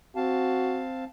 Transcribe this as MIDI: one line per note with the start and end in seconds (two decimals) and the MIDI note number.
0.16 1.04 60
0.16 0.85 66
0.16 1.04 77
0.16 1.04 81